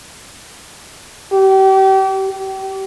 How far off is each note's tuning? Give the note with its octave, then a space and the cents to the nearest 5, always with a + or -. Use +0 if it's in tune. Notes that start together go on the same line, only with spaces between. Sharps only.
G4 -35
G4 -35